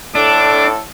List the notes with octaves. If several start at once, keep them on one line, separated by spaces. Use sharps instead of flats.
A2 D4 A4 D6